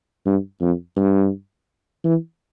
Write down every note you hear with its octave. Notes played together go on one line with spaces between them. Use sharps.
G2
F2
G2
E3